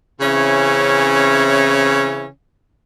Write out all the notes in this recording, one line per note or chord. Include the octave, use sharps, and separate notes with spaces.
C#3 E3 C4 C#4 E4 C#5